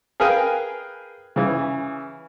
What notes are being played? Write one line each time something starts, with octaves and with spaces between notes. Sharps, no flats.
G#4 A#4 B4 F5 G5 G#5
C#3 E3